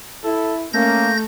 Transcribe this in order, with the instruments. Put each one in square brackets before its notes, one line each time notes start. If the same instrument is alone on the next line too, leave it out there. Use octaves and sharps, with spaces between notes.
[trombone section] E4 [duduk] A4
[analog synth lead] A3 [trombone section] A#3 [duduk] C#4 [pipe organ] G6 A#6